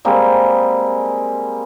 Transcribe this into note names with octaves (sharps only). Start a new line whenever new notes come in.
G3 G#3 A#3 C4